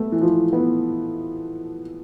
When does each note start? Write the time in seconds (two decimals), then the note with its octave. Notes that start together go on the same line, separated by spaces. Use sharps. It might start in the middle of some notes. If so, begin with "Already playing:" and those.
Already playing: A3 B3
0.12 E3
0.21 F3
0.53 B3